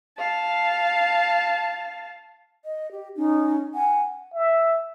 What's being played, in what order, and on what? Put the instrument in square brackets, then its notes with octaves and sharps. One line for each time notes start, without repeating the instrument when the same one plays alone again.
[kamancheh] F5 A5
[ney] D#5
G4
[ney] C#4 [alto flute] D#4
[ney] F#5 [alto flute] G#5
[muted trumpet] E5